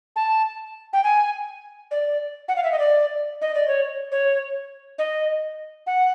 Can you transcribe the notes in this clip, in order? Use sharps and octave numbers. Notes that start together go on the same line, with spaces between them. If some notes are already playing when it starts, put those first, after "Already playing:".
A5
G5
G#5
D5
F#5
F5
E5
D#5
D5
D#5
D5
C#5
C#5
D#5
F#5